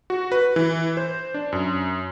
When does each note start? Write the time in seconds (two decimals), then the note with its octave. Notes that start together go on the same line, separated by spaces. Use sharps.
0.10 F#4
0.32 B4
0.56 E3
0.97 C5
1.34 D4
1.52 F#2